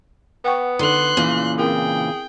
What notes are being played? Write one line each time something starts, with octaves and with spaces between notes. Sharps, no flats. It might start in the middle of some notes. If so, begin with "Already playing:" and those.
B3 F#5 G5 C#6
D3 D#4 A4 B4 C6 F#6
A#2 C#3 E3
C4 E4 G#4 A#4 G5